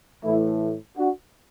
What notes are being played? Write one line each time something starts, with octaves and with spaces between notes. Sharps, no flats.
A2 E3 A3 E4
D4 F#4